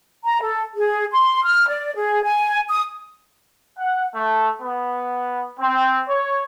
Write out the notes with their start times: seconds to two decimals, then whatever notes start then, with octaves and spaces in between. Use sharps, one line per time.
0.25 A#5
0.42 A4
0.76 G#4
1.11 C6
1.44 F6
1.68 D5
1.95 G#4
2.24 G#5
2.69 D#6
3.78 F#5
4.14 A3
4.61 B3
5.60 C4
6.07 C#5